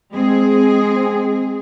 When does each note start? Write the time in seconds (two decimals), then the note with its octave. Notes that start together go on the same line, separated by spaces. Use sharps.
0.11 G#3 C4 G#4